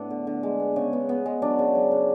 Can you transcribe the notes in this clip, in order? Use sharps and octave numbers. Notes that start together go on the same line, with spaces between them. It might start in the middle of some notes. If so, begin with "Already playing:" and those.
Already playing: A2 B3 D4
D3
D3
G#3
B3
C#3
B3
B3
G#3
F#3 D4
C#3
F#3
C#3